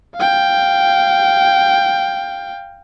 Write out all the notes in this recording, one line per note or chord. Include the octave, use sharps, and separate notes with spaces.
F5 G5